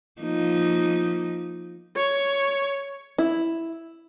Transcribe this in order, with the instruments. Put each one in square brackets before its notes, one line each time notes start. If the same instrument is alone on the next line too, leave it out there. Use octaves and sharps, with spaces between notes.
[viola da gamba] F3 A#3 D#4
[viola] C#5
[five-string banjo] E4